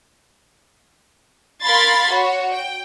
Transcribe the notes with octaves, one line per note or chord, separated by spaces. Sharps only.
A#4 F5 B5 C6 G#6 A6
F#4 C#5
G5